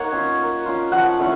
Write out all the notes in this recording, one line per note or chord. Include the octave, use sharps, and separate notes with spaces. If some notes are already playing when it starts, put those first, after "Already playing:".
Already playing: A#3 D#4 C#5 F#5
C#4 F4
A#3
C#4 F4
F3 F#5
A3 C#4 E4